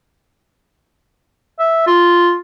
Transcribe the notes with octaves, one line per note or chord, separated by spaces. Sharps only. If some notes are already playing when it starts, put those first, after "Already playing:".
E5
F4